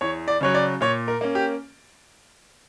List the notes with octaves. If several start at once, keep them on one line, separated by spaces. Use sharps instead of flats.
E2 C#5
D5
C#3 F#3 C#5
D5
A#2 C#5
A#4
A#3 C#4
G4